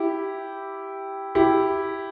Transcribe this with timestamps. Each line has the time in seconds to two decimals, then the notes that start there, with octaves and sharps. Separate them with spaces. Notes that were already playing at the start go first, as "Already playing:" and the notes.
Already playing: E4 G4
1.35 E4 G4